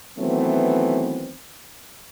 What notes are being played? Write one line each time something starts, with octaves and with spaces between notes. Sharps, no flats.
D#3 E3 F#3 A3 B3 C4